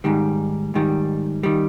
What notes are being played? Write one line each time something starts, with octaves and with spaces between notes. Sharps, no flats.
G#2 D#3 G3
G#2 D#3 G3
D#3 G3